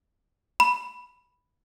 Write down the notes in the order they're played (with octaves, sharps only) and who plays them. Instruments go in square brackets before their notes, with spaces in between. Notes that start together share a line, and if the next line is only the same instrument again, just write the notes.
[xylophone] B5